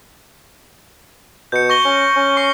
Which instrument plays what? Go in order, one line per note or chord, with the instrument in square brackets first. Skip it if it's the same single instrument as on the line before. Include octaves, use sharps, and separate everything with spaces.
[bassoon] B2 [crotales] G6 C#7
[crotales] C#6 A#6 G7
[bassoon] C#4
C#4
[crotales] C#6 C7